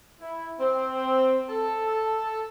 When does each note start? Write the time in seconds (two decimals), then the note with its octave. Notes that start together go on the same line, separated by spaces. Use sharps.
0.20 E4
0.59 C4
1.49 A4